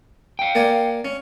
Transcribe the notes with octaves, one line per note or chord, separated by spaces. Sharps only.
F5 G5
A#3 D5 G#5
C#4